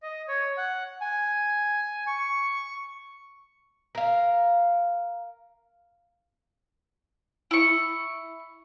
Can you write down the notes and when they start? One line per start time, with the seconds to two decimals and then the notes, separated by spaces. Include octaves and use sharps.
0.03 D#5
0.28 C#5
0.57 F#5
1.01 G#5
2.07 C#6
3.95 A#4 F5
7.51 E4 C#6